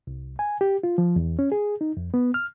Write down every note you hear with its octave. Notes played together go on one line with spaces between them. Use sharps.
C2
G#5
G4
F4
F3
E2
C#4
G#4
D#4
F2
B3
F6